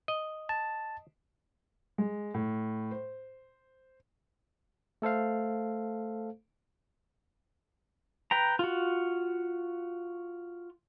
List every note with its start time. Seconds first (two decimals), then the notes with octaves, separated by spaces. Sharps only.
0.08 D#5
0.49 A5
1.98 G#3
2.34 A2
2.91 C5
5.02 A3 A4 C5 F5
8.31 B4 G5 A#5
8.59 F4 F#4